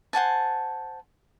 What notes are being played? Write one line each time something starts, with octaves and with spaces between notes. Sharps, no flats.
C5 F#5 G#5 A5